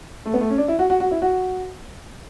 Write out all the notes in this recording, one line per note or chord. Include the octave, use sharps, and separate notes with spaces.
A3
B3
A3
C#4
D4
E4
F#4
F#4
F#4
E4
F#4